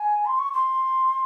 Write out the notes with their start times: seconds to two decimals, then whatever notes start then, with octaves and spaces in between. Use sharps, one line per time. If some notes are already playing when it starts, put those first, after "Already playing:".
Already playing: G#5
0.26 C6
0.39 C#6
0.53 C6